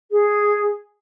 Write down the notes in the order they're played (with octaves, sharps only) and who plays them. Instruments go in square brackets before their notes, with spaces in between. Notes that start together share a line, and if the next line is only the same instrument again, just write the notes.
[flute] G#4